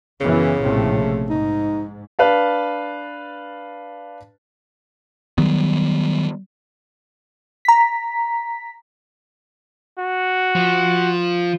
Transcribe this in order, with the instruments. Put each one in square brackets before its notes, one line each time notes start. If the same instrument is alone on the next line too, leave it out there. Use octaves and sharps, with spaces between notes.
[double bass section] F#2 E3 B3 [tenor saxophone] C#3
[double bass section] A#1 C3 A3 [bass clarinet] A2
[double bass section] G#2 [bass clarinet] D#4
[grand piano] D4 B4 F5 A5
[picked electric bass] D#3 F#3 G3 B3
[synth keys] A#5 B6
[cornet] F#4
[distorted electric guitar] F3